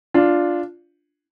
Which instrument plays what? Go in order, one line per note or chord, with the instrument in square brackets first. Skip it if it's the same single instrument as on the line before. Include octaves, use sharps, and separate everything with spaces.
[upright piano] D4 F4